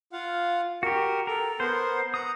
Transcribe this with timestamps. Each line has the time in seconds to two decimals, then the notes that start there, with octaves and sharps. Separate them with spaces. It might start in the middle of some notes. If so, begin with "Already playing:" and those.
0.13 F4 F5 F#5
0.83 F#4 G4 A#4
1.27 A4 A#4
1.60 B3 A#4 C5 F#5
2.14 F#5 A#5 D#6